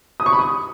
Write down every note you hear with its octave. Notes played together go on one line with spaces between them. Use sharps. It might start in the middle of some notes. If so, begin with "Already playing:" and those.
D#6
C#6
B5
D#6